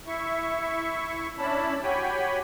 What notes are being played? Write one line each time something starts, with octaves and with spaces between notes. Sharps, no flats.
E4 E5 C#6
C#4 D4 E4 A5 B5
F#4 G4 C#5 G5 G#5 B5